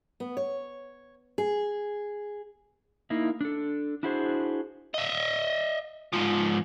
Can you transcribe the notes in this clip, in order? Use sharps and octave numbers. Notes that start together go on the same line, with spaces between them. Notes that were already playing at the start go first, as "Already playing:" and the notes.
B3
C#5
G#4
A#3 D#4 E4
D4 A4
D4 E4 F#4 G#4 C5
D#5 E5
G#2 F3